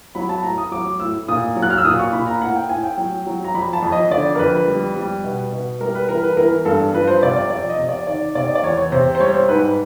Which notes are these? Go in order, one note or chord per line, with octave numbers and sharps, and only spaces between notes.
F#3 B5
A5
A2 A#5
D#6
F#3 D6
A2 E6
A#2 D#6
F#3
F#6
F6
E6
A#2 D#6
C#6
A#2 B5
A#5
A2 F#5
G5
A2 G#5
G5
F#3
F#3
A#5
F2 B5
A5
F2
D#5
D3 D5
A#4
F2 B4
G3
G3
B2
B2
G3 A#4
B4
E3 A#4
B4
E3 A#4
G2 A4
F3 B4
C5
C3 D5
D5
F2 D5
D#5
C3
D5
D#3 D5
C3 D5
D#5
D5
E2 C#5
C#5
C3 C5
C5
G3 C#5
C5
G#2 B4